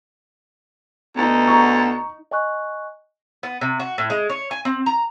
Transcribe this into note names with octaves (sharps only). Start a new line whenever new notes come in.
D2 B3 D#4
A#5 C#6
D#5 G#5 C#6 F#6
B3
C3
F#4
A2
G#3
C#5
G#5
C4
A#5